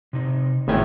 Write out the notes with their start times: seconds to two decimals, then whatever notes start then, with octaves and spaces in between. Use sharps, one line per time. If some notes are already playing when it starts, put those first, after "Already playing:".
0.13 C3 D#4
0.68 G#1 A2 D#3 B3 E5 G#5